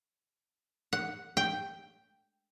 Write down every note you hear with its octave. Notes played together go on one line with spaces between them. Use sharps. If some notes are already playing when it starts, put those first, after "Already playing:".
F#5
G5